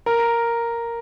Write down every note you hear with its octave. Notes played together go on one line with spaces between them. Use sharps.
A#4